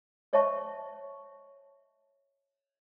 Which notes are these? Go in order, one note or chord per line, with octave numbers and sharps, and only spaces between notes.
C5 C#5 D#5 E5 A5 C#6